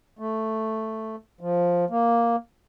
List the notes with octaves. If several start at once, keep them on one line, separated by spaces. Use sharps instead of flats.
A3
F3
A#3